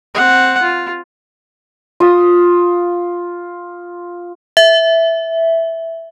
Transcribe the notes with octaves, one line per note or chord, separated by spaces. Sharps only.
C4 F#5
F4
F4 D#6
E5